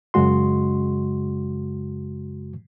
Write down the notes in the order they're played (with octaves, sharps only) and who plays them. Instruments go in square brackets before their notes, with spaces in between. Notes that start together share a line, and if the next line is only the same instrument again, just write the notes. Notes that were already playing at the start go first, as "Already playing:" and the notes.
[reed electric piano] F#2 C#3 G#3 F#4 C6